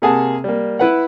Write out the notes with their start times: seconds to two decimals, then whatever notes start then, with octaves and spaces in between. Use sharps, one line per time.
0.02 C3 A#3 G#4 F#5 A5
0.44 G3 A#3
0.79 E4 B4 F#5